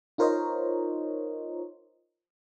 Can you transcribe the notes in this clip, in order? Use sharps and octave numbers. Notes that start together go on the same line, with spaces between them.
D#4 F4 A#4 C5 C#5 D#5